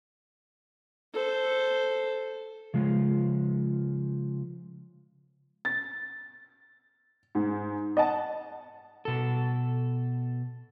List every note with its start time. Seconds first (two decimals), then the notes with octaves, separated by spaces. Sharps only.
1.14 A4 C5
2.74 C#3 F3 G#3
5.65 A6
7.35 G#2
7.97 D#5 F#5 A5
9.05 B2 A4